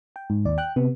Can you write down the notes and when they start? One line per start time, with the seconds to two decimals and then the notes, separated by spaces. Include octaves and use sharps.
0.16 G5
0.30 G#2
0.45 D#2 D5
0.58 G5 F#6
0.76 C3 B3